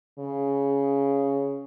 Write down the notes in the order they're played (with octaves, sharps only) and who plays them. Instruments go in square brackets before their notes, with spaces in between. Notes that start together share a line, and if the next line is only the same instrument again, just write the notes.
[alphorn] C#3